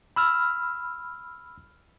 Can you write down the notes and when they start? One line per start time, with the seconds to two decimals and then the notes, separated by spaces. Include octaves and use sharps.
0.16 B5 E6 F6